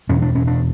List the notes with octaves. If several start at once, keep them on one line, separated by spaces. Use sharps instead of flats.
E2 B2 C#4
D4
C#4
D4